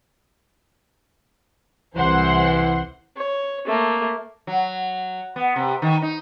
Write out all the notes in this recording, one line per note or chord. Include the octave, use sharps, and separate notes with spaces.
C2 E3 C5 F#5 C6
C#5
A3 A#3
F#3
B3
C3
D#3
D#4